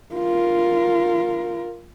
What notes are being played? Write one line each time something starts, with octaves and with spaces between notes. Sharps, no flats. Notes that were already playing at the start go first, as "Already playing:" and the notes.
F4 A#4